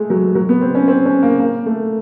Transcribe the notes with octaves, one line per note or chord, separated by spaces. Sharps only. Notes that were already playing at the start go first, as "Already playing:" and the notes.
Already playing: G#3 A3
F#3
F#3
B3
C4
C#4
C4
C#4
A#3
A#3
A3